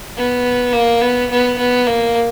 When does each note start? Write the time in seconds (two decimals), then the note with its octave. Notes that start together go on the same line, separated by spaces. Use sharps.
0.17 B3
0.73 A#3
1.01 B3
1.30 B3
1.57 B3
1.87 A#3